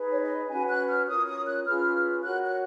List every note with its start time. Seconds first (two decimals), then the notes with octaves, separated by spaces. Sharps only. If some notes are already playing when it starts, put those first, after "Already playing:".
Already playing: D#4 G#4 B4
0.12 C#5
0.21 D#5
0.49 C#4 F#4 B4 G#5
0.69 F#6
0.88 F6
1.08 C#4 F4 A#4 C#5 D#6
1.28 D#6
1.46 F#6
1.66 C#4 F4 G#4 B4 F6
2.24 F#4 A#4 C#5 F#6
2.44 F#6